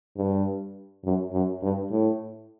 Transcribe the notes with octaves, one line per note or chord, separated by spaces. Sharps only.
G2
F#2
F#2
G2
A2